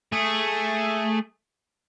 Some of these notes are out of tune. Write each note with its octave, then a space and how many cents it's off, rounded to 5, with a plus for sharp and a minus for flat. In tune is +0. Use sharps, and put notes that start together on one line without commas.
A3 +0 G#4 +0